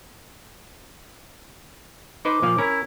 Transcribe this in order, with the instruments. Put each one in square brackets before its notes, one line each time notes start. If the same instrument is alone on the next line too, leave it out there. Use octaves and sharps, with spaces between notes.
[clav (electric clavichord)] D#4 B4 C5 [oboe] D6
[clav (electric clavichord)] A#2 F3 F5
[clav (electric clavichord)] C#4 A#4 [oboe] E4